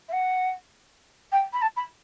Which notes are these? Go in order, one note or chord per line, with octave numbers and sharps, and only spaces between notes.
E5
F#5
G5
B5
A5
B5